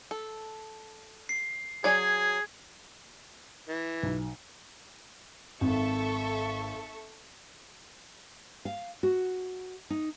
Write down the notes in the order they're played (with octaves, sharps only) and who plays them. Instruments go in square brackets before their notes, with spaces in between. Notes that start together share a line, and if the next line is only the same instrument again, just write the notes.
[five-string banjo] A4
[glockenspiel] C7
[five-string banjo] F#3 D5 G#5 [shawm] G#4 [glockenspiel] G#6
[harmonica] E3
[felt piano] B1
[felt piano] G#1 [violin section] A4 E5 C#6
[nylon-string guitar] F5
F#4
D#4